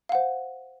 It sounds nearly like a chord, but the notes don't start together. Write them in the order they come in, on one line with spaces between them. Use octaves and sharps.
F5 F#5 C5